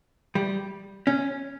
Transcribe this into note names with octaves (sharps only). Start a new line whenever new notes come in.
G3
C#4